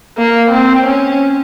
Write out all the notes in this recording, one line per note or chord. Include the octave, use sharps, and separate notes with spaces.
A#3
C4
C#4